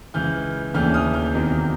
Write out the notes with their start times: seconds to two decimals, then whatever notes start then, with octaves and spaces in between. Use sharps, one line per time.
0.14 C#2 C#3 E3 F6 G6
0.74 D#2 C#3 E3 A3 D4 F6 G6
0.94 D#6 F6
1.14 F6 G6
1.34 E2 C3 D#3 F#3 A#3